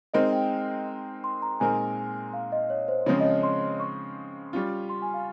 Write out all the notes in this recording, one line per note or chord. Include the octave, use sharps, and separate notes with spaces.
G#3 C4 D#4 A#4 D#5
G5
C6
A#5
A#2 G#3 C4 D#4 A#4 G#5
F5
D#5
C#5
C5
C#3 F3 G#3 C4 C#5
D#5
C#5
C6
C#6
G3 C#4 F4
C6
G#5
F5